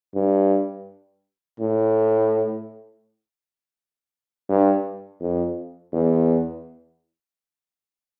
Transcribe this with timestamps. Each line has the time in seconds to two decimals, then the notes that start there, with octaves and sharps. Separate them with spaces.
0.14 G2
1.60 A2
4.49 G2
5.21 F2
5.93 E2